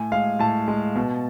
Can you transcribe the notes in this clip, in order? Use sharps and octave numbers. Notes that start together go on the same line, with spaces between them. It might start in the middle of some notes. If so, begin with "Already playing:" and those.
Already playing: A2 G#5
G#3 F5
A2 A5
G#3
B2